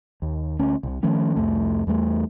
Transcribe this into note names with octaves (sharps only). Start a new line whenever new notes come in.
D#2
D2 C#4
C2 C3
D#3 F3 A3 C#4
C2 F2 A3
E2 G3 A3